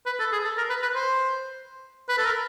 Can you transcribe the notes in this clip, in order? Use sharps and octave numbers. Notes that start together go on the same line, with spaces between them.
B4
A4
G#4
A4
A#4
B4
B4
C5
B4
A4
A#4